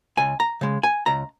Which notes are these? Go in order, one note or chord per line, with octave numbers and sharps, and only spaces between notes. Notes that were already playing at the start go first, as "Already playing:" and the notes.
C#2 G#5
A#5
C#3 G#3
G#5
C#2 A#5